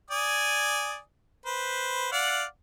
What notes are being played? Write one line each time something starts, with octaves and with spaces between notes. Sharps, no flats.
D5 G#5 D#6
B4 C5
D5 F5 F#5